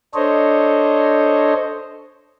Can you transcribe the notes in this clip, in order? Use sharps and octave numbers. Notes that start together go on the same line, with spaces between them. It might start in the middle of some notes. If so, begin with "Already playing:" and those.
D4 A4 C5 C#5 D#5